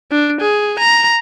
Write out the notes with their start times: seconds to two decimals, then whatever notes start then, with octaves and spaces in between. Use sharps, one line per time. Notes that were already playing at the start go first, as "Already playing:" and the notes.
0.12 D4
0.41 G#4
0.79 A#5